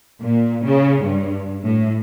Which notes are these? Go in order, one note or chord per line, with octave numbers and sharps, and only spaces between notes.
A#2
C#3
G2
A2